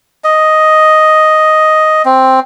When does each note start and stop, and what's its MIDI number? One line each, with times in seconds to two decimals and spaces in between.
0.24 2.02 75
2.05 2.40 60